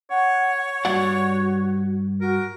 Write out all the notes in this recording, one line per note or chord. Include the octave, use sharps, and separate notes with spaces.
C#5 F#5
G2 F#4 D5 F#5
F#4 A#4